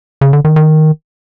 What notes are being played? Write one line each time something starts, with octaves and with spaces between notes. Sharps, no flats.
C#3
D3
D#3
D#3